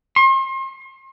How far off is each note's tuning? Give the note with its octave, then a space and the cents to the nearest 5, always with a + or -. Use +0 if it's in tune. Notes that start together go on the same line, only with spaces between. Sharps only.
C6 +40